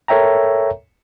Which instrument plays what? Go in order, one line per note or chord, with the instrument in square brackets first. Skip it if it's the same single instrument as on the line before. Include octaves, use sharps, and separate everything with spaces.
[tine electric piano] A4 A#4 C#5 E5 G5 A#5